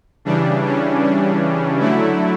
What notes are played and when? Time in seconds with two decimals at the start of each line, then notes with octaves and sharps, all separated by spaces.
0.25 C#3 E3 G3 D4
0.64 C#4
1.03 D4
1.80 D3 F#3 A3 E4